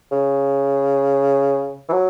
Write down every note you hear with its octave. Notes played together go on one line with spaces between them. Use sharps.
C#3
E3
F#3